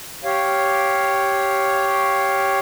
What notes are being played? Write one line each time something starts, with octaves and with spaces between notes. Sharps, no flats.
G4 C#5 F5